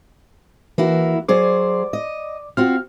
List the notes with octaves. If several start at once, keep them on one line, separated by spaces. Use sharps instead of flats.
E3 A#3 E4 F#4
F#3 G#4 C5 D5 D6
D#5
C4 F4 F#4 F6